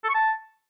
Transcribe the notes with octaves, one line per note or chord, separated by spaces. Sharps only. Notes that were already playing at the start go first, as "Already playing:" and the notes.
A4
C#6
A5